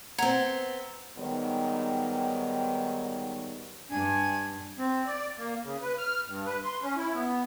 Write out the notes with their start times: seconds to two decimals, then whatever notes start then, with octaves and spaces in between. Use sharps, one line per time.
0.18 B3 C4 F#5 A#5 G#6
1.17 G#2 D#3 F#3 G3 B3
3.91 G2 D4 G#5
4.78 C4
5.06 D5
5.38 A#3
5.63 C#3
5.82 B4
5.98 F6
6.26 G2
6.46 B4
6.64 C6
6.83 C#4
6.97 E4
7.14 B3